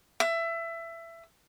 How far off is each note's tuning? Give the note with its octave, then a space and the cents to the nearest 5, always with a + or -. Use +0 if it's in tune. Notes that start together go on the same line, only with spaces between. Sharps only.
E5 +20